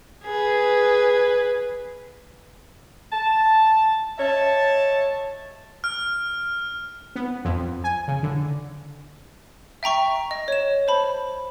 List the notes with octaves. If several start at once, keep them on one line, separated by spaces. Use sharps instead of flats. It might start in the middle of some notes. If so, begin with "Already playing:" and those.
G#4 B4
A5
C#5 D#5 E5 A5
F6
B3
F2
G#5
C#3
D3
E5 G5 A#5 C#6
D#5
C#5 E7
C5 A5 B5